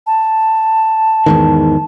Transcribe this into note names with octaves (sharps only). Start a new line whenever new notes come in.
A5
E2 G#2 D#3